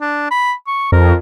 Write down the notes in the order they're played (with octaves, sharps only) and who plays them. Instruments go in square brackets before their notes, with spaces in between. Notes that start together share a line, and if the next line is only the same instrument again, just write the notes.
[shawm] D4
B5
C#6
[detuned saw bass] F2 [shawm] A#4